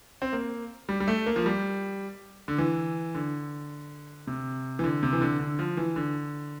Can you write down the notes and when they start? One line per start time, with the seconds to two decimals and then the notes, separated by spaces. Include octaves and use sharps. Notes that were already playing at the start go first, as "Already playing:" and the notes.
0.22 C4
0.33 A#3
0.89 G3
1.00 G3
1.08 A3
1.26 A#3
1.36 F3
1.46 G3
2.48 D3
2.58 E3
3.15 D3
4.27 C3
4.79 E3
4.84 D3
5.03 C3
5.13 E3
5.21 D3
5.40 D3
5.59 F3
5.77 E3
5.96 D3